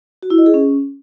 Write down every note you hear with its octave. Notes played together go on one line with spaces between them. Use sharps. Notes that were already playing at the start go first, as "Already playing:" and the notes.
F#4
E4
D#5
G#4
C#4